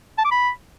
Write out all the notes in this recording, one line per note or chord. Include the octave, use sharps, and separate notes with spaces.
A5
D6
B5